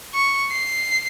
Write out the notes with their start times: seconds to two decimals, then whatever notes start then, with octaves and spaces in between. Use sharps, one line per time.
0.14 C#6
0.51 C7